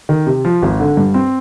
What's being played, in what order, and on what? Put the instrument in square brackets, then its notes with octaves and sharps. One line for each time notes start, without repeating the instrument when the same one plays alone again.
[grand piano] D#3
C3
F3
G#1
D3
G2
C4